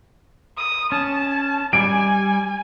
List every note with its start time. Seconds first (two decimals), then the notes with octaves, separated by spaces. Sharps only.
0.57 D#6
0.92 C#4 A5
1.73 G3 G#5 D7